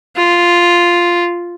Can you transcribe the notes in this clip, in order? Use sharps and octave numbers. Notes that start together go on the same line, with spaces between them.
F4